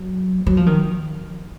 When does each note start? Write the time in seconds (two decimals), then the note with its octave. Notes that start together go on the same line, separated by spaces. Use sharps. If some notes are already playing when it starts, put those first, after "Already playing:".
Already playing: F#3
0.47 F#3
0.57 F3
0.66 D#3